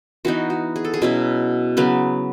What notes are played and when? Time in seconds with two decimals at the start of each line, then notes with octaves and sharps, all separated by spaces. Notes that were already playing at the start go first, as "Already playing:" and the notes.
0.25 E3 B3 D#4 F#4
0.50 F#4
0.76 G#4
0.85 A4
0.94 G#4
1.02 B2 F#3 C#4 E4
1.77 C#3 F#3 B3